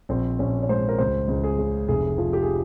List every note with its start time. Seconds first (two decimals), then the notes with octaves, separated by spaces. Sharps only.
0.09 A#1 C4
0.39 A#1 C#4
0.62 C#5
0.69 G#2 C5
0.89 A#4
0.99 C#2 C5
1.28 C#2
1.44 G#4
1.58 C#3
1.88 F1 G#4
2.18 F3
2.33 G4
2.42 G#4